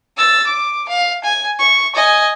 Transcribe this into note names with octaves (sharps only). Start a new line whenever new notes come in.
E6 A6
D6
F5
G#5
C#6
D#5 G#5